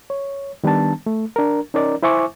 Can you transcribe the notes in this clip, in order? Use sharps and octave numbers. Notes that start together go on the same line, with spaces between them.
C#5
D#3 G3 B3 D4 A5
A3
D4 A#4
C#4 D#4 A#4 D5
E4 C5 E5 G#5 C#6 D6